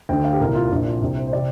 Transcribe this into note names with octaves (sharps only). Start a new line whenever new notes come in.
D2 D3 G5
F5
G4
C2 A#2 A#4
F4
A#1 A#2 D4
F4
C2 C3
C5
C5
C3 D5